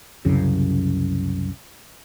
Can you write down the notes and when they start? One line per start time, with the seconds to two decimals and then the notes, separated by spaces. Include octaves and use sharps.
0.25 C2 F#2 C#3